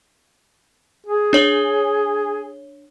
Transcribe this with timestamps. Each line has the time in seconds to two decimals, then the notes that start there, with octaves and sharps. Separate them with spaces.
1.06 G#4
1.33 D4 C#5 G7